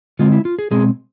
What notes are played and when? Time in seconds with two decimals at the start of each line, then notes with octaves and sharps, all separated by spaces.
0.19 D3 G#3 C4 F4
0.32 E4
0.45 F4
0.59 G#4
0.71 B2 G#3 C4 G#4